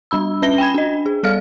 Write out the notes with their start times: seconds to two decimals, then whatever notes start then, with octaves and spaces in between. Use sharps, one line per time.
0.11 G3 D4 B5 E6
0.42 C#4 B4 E5 A#6 G7
0.58 G5 G#5 B5 G#6
0.75 D4 D#5
1.06 G#4
1.23 G3 A4 D5 F5 F6